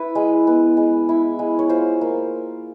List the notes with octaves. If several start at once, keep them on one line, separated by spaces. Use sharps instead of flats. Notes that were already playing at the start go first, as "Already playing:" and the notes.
Already playing: E4 B4
G#3
B3
G#3
E4
G#3
C#5
F4 C5
A#3